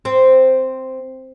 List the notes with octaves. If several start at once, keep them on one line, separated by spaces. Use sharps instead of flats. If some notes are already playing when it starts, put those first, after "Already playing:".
C4